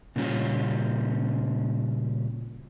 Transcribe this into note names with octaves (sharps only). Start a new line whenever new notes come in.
A#2 C#3 G3 C#4 F4